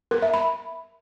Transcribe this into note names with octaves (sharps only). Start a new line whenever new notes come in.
A#4
E5
B5